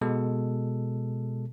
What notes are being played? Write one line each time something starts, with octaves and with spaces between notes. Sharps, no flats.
B2 G#3 A4